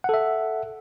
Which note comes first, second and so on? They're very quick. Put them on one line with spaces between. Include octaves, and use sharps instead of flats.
F#5 A4 E5